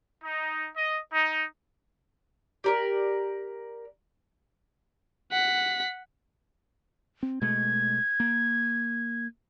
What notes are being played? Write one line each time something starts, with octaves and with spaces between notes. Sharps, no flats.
D#4
D#5
D#4
G4 A#4 D5
F#5 B6
C4
B2 G#3 A3 G#6
A#3